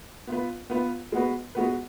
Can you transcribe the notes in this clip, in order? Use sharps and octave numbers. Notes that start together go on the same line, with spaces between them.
B3 F4 B4
B3 F4 B4
G#3 B3 F#4 B4
G#3 B3 F#4 B4